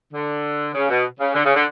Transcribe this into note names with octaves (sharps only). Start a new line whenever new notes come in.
D3
C#3
B2
C#3
D3
C#3
D3